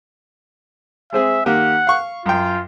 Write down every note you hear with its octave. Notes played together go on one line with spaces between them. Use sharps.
G#3 C4 G#4 E5
D#3 A#3 G4 F#5
F5 C#6
F#2 F4 G5